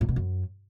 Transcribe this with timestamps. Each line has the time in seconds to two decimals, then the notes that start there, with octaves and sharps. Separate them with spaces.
0.01 A2
0.09 B2
0.16 F#2